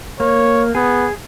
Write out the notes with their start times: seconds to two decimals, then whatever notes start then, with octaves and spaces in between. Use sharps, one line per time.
0.20 A#3 C#5
0.75 B3 G#4